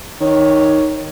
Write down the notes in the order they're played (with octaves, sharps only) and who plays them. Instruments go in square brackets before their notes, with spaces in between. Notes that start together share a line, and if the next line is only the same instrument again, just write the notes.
[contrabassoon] D#3 [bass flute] C#5